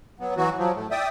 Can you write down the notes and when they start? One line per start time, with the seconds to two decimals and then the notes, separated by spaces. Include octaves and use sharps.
0.20 F#3 B3
0.37 E3 F#3 F#4
0.58 F3 F#3
0.76 A2 A3
0.91 D5 E5 G5 D#6